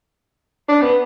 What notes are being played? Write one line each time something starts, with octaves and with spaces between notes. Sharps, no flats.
D4
B3